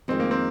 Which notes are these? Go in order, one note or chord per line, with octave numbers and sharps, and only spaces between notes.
F2 D#3 G#3 C4
A#3
C4